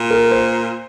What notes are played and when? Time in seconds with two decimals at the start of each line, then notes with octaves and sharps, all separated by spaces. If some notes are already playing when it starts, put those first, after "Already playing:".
Already playing: A#2
0.11 A#4
0.31 C5